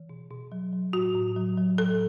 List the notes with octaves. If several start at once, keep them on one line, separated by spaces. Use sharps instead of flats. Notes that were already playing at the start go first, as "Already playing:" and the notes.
Already playing: E3
B2
B2
F#3
F#3
A2 F#4
A2
F#3
F#3
A2 A4